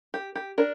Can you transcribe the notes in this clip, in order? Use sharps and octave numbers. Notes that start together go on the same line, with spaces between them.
G4
G4
D4 A#4